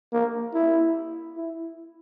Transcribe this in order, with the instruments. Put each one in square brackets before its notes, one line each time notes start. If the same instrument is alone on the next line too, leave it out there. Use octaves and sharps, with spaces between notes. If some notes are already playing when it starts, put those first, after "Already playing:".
[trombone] A#3
E4
E4